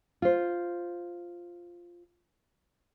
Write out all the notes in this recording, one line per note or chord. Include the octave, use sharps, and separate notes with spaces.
F4 C5